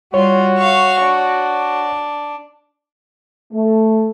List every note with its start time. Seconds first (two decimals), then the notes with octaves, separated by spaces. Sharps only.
0.14 G3 F4 F#4 C#5
0.57 F5 C#6
1.01 D4
3.54 A3